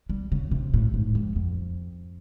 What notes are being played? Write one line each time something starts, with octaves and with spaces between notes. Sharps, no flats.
G3
C#3
C3
A2
G#2
F2
F2